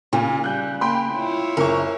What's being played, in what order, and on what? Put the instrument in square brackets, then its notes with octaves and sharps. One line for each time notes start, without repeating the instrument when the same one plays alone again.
[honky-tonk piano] A#2 [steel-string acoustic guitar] C#3
[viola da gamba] G3 [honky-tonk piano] F#6 G6
[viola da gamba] A#3 [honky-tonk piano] G5 B5 C6
[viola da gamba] E4 F4 C#5
[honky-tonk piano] F#1 C#6 [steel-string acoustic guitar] A#4